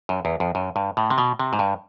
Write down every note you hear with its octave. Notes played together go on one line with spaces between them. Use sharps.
F#2
E2
F2
F#2
G2
A2
C3
B2
C3
G#2
G2